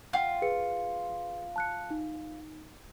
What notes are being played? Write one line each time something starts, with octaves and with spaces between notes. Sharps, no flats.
F4 F#5 G5
G#4 B4 C#7
A5 F#6 C#7
D#4